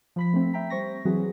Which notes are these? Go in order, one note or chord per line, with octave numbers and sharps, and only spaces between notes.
F3 B5 B6
A3 C4
E5 G5 A#5 B6
G3 C5 C#6 A#6
E3 F#3 C4 F#4 G#4